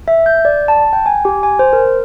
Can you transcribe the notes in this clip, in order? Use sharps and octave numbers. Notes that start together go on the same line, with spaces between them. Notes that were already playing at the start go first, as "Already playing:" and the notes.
E5
G6
D5
A5
G5
G#5
G4
G#5
C5
A#4